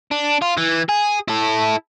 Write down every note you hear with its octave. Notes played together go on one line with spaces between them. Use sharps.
D4
F4
E3
G#4
E4 A4